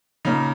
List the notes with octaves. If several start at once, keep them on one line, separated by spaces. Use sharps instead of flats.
A#2 C#3 A#3 D#4